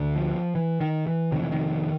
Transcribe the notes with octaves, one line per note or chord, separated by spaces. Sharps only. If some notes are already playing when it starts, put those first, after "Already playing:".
Already playing: D2 D3
F3
E3
D#3
E3
F2 C3 D#3
E3
D#3